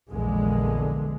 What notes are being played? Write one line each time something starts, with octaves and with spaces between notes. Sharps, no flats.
A#1 E2 D3 G#3